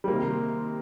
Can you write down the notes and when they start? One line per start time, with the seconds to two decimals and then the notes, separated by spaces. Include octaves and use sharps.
0.04 G3
0.08 C3 D#3 A#3 C4